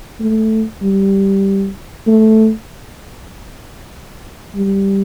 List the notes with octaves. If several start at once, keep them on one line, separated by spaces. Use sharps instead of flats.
A3
G3
A3
G3